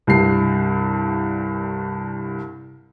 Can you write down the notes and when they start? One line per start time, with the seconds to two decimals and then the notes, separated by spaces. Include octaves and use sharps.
0.07 C2 G2 C7